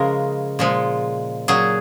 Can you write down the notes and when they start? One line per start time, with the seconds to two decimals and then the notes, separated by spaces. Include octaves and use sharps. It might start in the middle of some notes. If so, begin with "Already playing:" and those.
Already playing: C#3 F3 G#3 A#4
0.59 A#2 F3 G#3
1.48 A#2 F#3 G#4